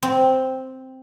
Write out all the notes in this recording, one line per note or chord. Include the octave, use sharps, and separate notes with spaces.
C4